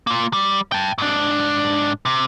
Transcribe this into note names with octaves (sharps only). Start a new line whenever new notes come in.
A#3 F4
G3
G5 A5
G#2 D4
C3